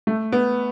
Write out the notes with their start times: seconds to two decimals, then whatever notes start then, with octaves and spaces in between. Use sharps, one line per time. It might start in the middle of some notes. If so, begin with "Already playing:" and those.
0.07 A3
0.32 B3